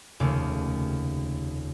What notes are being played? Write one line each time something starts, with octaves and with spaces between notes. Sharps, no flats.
F1 D#2 C#3 A3 D6 D7